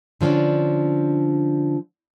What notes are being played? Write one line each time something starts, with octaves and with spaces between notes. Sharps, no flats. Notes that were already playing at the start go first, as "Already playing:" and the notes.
D3 F3 G3 C#4 D4